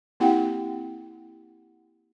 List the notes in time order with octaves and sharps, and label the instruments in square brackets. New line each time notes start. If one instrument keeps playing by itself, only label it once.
[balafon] A#3 C4 E4 G4 F#5 G5